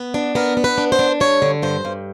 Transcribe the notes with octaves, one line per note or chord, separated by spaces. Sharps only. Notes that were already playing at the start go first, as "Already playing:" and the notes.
Already playing: B3
D4
B3 A#4
B3
B4
D4
C5
D4
G2 C#5
D3
G2 C5
G2